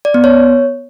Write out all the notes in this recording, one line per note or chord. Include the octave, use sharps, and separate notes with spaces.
D5
B3
C#5